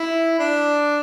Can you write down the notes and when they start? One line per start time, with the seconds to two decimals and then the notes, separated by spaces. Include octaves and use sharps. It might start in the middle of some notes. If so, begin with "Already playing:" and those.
Already playing: E4
0.39 D4